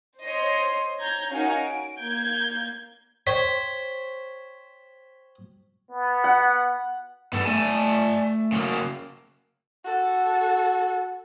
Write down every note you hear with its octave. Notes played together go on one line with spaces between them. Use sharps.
C5 C#5 D#5 C6
C#5 A#5 G6 G#6
C#4 D#4 F#4 A#4 F5 G#5
D7
A#3 G6 G#6
C5 C#5 G5 B6
B3
F#5
G2 B3 A4
A3 D5 G#5 A5
C#3 F#3 A#3
F#4 A4